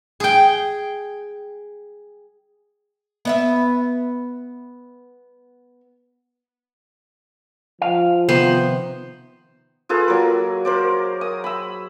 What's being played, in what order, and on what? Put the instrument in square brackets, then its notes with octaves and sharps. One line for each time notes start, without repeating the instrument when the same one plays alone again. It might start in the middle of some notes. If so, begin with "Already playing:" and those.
[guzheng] G#4 G5
[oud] B3 D#5 E5
[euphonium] F3 [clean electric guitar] F5
[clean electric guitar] C3 D#3 [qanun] B3 C5
[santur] F4 G#4 A4 B4
F#3 A#3 A#4
A#4 C5 D5
D#6
B5 E6